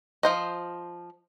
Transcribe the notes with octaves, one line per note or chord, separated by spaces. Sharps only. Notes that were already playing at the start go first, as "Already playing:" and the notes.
F3 C5 D#5